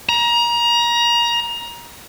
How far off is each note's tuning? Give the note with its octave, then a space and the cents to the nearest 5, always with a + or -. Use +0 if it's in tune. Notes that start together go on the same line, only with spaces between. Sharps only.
A#5 +25